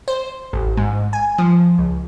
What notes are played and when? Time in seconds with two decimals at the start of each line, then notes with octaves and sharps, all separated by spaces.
0.08 C5
0.53 A1
0.77 G#2
1.13 G#5
1.38 F3
1.78 C#2